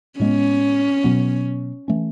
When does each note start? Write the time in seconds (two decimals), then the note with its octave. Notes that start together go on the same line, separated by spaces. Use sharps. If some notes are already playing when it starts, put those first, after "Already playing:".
0.20 A2 G#3 B3 C#4
1.04 B2 F#3 B3
1.88 E3 A3 C#4